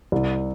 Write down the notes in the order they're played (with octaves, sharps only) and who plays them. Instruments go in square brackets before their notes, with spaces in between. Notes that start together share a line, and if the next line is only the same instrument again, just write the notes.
[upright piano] C2